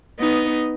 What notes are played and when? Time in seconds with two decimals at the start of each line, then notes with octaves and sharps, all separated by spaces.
0.19 B3 D#4